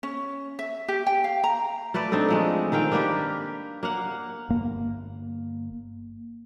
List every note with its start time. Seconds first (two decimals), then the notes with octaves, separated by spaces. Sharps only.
0.03 C#4
0.59 E5
0.88 G4
1.07 G5
1.24 F5
1.44 A#5
1.94 A3 A4 B4 D5
2.12 C4 D4 D#4 A4
2.29 F3 G#3 A3
2.72 D#3 C4 F5 G5
2.92 A#3 D4 G4 B4
3.83 A#3 F5 F#5
4.49 G1 A#3